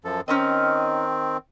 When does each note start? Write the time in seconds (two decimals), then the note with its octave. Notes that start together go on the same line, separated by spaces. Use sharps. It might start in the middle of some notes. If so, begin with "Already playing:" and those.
0.04 F#2 F3 A4
0.28 D#3 C4 C#4 D#4 D#5